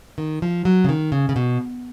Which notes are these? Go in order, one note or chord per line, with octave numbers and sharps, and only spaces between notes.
D#3
F3
F#3
C#3
D#3
C#3
C#3
B2